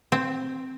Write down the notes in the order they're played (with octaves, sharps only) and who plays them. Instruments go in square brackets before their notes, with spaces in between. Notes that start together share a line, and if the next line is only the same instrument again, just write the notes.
[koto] C4